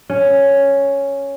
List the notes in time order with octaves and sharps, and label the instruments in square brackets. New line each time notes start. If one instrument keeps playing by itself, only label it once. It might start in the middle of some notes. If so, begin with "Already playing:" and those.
[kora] C#4